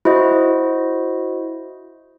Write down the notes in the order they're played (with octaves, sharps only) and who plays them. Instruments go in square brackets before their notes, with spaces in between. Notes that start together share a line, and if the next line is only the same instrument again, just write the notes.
[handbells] E4 F#4 C5 D#5